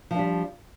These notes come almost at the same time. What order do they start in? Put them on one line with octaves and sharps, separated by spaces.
F3 D4 G3